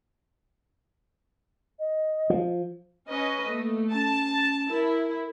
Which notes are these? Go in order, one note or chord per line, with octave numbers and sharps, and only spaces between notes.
D#5
F3
C#4 B4 D#5
A3 A#3
C#4 A5
E4 A#4